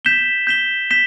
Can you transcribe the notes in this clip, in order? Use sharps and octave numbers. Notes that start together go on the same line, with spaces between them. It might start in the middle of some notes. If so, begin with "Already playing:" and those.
G6 B6 E7 G7
G6 B6 E7 G7
G6 B6 E7 G7